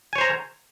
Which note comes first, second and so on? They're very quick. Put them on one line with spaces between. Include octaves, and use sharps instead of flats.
G#5 C#5 C5 A#5